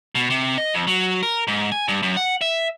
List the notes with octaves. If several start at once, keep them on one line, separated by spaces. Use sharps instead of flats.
B2
C3
D#5
F2
F#3
A#4
G#2
G#5
G2
F#2
F#5
E5